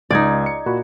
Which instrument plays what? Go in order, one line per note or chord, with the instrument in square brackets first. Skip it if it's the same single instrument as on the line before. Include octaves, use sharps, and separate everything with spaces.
[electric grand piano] C#2 G#6 [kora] D#4 D5
[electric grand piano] C#7
A#2 F#4 B5